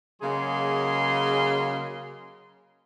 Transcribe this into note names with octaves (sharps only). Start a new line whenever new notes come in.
C#3 F#3 A#3 G#4 D#5 C6